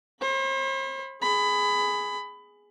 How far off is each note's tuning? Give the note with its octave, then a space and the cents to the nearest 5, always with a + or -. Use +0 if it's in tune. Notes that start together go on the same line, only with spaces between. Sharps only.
C5 +45 B5 +20
G#4 +0 B5 +20